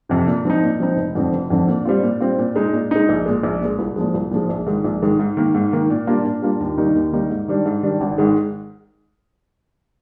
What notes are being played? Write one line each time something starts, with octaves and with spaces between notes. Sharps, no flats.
F2 C3
A#2
F3 C4 D#4
A#2
F3 C4 D#4
F1
F2 D3 F3 C4
F1
F2 D3 F3 C4
A#2
G3 C4 F4
A#2
G3 C4 F4
A#2
G#3 D#4
A#2
G#3 D#4
A#1
A#2 G#3
A#1
A#2 G#3
C2
A#2 F3 G#3
C2
A#2 F3 G#3
A#1
G#2 D#3 G#3
A#1
G#2 D#3 G#3
G#2
D#3 A#3
G#2
D#3 A#3
A#2
G3 A#3 D4 F4
A#2
G3 A#3 D4 F4
D#2
D#3 G3 A#3 D#4
D#2
D#3 G3 A#3 D#4
G#2
D#3 G3 D4
G#2
D#3 G3 D4
G#1
G#2 D#3 G#3